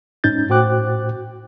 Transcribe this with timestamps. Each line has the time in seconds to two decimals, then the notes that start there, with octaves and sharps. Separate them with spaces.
0.24 G#2 C#4 D#4 G6 A6
0.49 A2 F#4 C5 G5 D6 F#6